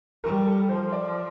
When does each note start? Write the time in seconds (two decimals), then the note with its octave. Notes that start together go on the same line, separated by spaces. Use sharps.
0.24 G3 A#4
0.47 A4
0.69 F3 C5
0.92 D5